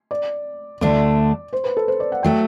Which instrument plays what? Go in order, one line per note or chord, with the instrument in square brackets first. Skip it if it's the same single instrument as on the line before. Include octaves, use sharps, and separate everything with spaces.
[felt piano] D5
[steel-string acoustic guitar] D2 D3 A3 D4 [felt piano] D5
[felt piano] C5
B4
A4
C5
D5
F#5
[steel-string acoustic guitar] F#3 A3 [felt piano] G5